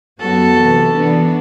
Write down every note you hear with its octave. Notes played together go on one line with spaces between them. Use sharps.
F#2 F#3 B3 F#4 A4
C3 E3 B3
E3 B3 D4 F#4